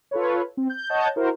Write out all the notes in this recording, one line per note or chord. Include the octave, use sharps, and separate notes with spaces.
F4 A4 B4 C#5
C4
G6
C#5 D#5 F#5 A5 G6
E4 F#4 A#4 C5